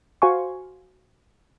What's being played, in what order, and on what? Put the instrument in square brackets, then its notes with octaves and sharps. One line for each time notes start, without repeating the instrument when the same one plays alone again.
[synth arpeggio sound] F#4 C5 F5 G#5 C6 C#6